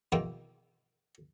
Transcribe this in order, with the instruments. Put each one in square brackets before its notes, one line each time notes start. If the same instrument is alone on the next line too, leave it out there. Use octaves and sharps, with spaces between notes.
[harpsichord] E2 B2 D#3 A#3 E4 G5